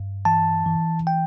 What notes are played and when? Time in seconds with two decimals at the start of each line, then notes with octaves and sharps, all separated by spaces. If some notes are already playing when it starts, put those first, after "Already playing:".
Already playing: G2
0.25 E3 A5
0.66 E3
1.07 G5